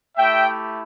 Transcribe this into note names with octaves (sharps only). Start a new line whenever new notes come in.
A3 E4 G4 E5 G5